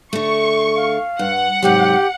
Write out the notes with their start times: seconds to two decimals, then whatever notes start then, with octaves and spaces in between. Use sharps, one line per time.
0.13 D3 A3 C#6
0.76 F5
1.19 G2 F#5
1.62 G#2 C3 F#3 G4